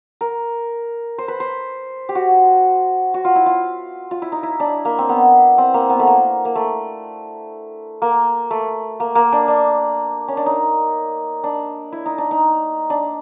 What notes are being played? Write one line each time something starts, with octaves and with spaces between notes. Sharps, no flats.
A#4
C5
B4
C5
G4
F#4
F#4
F4
E4
F4
F4
E4
D#4
E4
D4
A#3
C4
B3
C4
A#3
B3
A3
A#3
A#3
A3
A#3
A3
A#3
A#3
D4
D4
C#4
D4
D#4
D4
E4
D#4
D4
D#4
D4